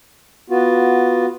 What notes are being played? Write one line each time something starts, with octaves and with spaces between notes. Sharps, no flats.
B3 F4 F#4